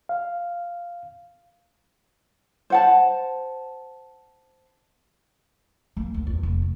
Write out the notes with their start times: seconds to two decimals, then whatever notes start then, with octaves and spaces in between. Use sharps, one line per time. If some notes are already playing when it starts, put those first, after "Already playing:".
0.09 F5
2.70 C5 F#5 A5
5.97 A#3
6.14 D#2
6.27 E2
6.43 F1
6.62 A3